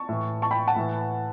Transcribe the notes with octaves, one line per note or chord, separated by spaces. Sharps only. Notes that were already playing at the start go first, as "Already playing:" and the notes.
Already playing: A5 C#6
A2 E3
A5 C#6
G5 B5
F#5 A5
A2 E3